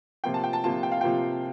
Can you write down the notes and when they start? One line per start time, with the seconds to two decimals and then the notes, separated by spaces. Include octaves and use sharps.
0.24 C3 F3 A#3 F4 G5
0.34 A5
0.44 G5
0.53 A5
0.64 C3 F3 A#3 F4 A5
0.83 G5
0.92 F5
1.01 C3 F3 A#3 F4 G5